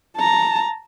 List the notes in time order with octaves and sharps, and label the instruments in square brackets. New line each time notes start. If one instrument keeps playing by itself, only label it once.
[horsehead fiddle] A5 A#5